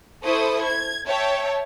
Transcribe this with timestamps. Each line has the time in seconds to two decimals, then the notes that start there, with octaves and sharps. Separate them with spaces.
0.24 E4 A4 C5 B5 C#6 D#6
0.64 G#6
1.07 C#5 E5 G5 A5